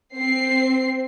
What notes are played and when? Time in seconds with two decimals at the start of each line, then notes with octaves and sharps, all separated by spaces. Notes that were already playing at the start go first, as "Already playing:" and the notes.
0.16 C4 C7